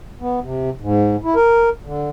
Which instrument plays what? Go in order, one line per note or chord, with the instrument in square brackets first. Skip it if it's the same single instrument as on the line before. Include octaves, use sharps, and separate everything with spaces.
[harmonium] B3
C3
G#2
E4
A#4
D3